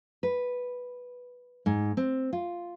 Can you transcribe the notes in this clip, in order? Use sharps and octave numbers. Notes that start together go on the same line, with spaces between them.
B4
G#2
C4
F4